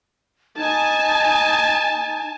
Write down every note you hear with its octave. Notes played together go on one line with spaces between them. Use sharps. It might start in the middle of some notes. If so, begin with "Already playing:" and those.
D#4 G#5 A5